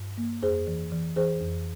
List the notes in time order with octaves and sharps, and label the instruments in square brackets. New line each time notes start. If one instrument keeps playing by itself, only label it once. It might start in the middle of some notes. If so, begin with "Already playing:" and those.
Already playing: [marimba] G2
A#3
F2 G#4 C5
E3
E3
E3 G#4 C5
F2